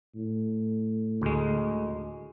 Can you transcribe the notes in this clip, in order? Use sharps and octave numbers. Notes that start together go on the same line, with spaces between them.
A2
D2 G#3